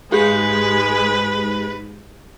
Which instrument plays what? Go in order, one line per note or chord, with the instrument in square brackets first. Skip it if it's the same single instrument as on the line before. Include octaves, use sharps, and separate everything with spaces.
[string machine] G#2 [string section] G#3 [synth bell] G4 G#4 G6 [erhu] B4